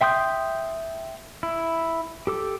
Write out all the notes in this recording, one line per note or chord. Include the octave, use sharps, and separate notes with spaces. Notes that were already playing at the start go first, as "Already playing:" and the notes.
E5 G5 C6 D#6 G6
E4
G4 A4 D6